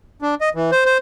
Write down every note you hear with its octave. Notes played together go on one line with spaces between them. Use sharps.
D4
D#5
E3
C5
C5